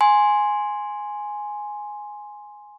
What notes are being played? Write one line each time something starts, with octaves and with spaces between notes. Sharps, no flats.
G#5 C6